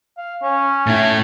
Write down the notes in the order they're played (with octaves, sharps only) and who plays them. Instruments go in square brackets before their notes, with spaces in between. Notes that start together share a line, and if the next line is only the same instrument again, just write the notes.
[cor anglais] F5
C#4
[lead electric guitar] A2 E4